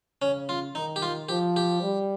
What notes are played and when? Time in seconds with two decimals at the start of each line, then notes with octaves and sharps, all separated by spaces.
0.22 C#3 C#4
0.49 F4
0.75 D#3 D#4
0.96 G4
1.02 F4
1.29 F3 G4
1.56 G4
1.82 G3